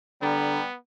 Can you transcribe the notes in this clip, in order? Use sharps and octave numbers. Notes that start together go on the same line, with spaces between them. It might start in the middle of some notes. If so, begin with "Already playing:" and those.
D3 G3 B3 A#5